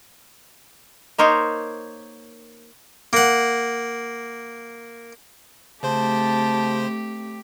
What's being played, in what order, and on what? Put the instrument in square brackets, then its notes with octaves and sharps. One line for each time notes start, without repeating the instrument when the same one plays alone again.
[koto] A#3 D#4 A#4 C5 C#5 D#5
[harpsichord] A#3 F#5
[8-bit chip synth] C#3 C5 C6 [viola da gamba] A3 C4 G4 [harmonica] A5